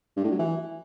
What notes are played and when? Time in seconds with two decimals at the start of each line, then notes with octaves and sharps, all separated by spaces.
0.16 G2
0.24 A2
0.31 F#3
0.39 E3